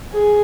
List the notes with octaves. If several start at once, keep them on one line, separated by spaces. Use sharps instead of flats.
G#4